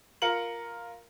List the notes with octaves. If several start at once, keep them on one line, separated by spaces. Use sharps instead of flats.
F4 A#4 C#7 F#7